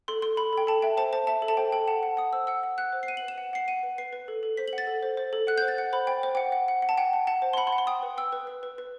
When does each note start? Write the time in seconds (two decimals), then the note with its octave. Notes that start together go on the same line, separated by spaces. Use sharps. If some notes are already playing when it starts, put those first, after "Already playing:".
0.08 A4 C6
0.22 A4 C6
0.37 A4 B5
0.53 A4 G5
0.67 A4 A5
0.82 E5 G5
0.97 C5 A5
1.13 C5 A5
1.27 E5 A5
1.42 A4
1.48 A5
1.57 C5 G5
1.72 A4 G5
1.88 F#5 A5
2.03 F#5
2.17 F#5 D#6
2.33 C5 E6
2.47 F#5 E6
2.63 F#5
2.78 F#5 F#6
2.93 C5
3.03 C7
3.08 F#5 D#7
3.17 F#7
3.22 B4
3.28 E7
3.38 F#5
3.53 F#5 C7
3.68 F#5 D#7
3.83 B4
3.98 B4 C7
4.13 B4
4.28 A4
4.43 A4
4.57 C5 B6
4.68 F#7
4.73 F#5
4.78 A6
4.87 A4
5.03 C5
5.17 C5
5.33 A4
5.47 F#5 F#6
5.58 C5 G6
5.68 A6
5.78 F#5
5.93 C5 B5
6.07 C5 G5
6.23 C5
6.35 F#5 G5
6.52 F#5
6.68 F#5
6.82 F#5
6.89 A5
6.98 F#5 G5
7.13 F#5
7.27 F#5 A5
7.42 C5
7.53 C6
7.57 F#5 B5
7.67 C6
7.73 F#5
7.78 C6
7.87 G5 D#6
8.03 B4
8.18 G5 E6
8.32 B4
8.47 B4
8.63 B4
8.78 B4